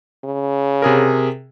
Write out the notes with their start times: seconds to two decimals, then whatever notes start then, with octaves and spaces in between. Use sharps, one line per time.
0.24 C#3
0.82 C3 G#4 A#4